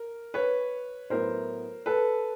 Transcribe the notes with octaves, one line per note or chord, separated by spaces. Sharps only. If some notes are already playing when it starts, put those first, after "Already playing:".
Already playing: A#4
B4 C#5
A2 F#3 B3 E4 A#4 C5
A4 B4